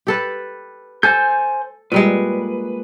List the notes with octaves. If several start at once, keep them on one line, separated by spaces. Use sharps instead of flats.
G4 A4 B4
A4 C5 G#5 G6
A#2 G3 G#3 B4